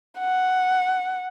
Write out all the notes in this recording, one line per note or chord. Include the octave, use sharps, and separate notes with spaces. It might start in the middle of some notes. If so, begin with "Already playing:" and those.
F#5